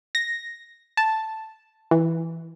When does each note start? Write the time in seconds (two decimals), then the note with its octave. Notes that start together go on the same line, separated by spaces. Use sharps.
0.15 A#6
0.97 A5
1.91 E3